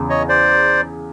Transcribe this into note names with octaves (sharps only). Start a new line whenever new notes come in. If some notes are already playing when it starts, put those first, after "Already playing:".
Already playing: E2 C#3
C#5 D#5
C5 D5